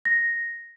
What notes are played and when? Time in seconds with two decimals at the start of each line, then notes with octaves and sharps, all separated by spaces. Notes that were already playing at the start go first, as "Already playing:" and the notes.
0.05 A#6